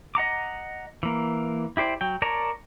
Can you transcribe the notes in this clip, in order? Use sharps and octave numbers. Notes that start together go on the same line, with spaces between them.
D#5 F#5 A#5 D6
E3 A#3
E4 G4 C5 D5
F#3 G5
A#4 C#5 D5 A5 A#5